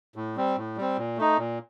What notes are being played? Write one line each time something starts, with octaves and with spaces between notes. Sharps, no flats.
A2
G3 C4
A2
G3 C4
A#2
A3 D#4
A#2